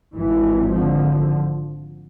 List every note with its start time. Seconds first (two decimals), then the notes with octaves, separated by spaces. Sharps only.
0.14 G#1 G#2 E3
0.73 D3 F3